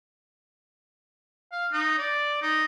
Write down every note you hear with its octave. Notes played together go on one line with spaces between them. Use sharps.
F5
D#4
D5
D#4